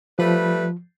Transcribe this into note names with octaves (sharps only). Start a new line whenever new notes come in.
F3 G3 A3 B4